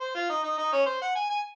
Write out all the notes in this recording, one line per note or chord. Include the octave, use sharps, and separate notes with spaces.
C5
F4
D#4
D#4
D#4
C#4
C5
F#5
G#5
G#5